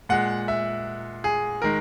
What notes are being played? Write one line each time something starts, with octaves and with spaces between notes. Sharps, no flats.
A#2 G#3 F#5
E5
G#4
D#3 G#3 A#4